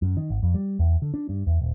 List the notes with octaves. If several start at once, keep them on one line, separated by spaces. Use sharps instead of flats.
F#2
D#3
G#1
F2
G3
E2
D3
D4
G2
E2
D#1